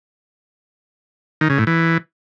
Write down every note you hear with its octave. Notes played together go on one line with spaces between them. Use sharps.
D#3
C#3
A2
E3